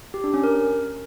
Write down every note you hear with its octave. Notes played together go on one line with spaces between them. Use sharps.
G4
D4
C#4
A#4